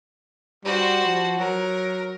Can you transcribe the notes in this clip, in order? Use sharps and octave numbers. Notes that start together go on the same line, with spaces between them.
G3 F#4 C5
F3
F#3 A#4